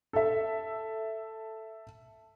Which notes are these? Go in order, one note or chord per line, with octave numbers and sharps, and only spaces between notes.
A4 E5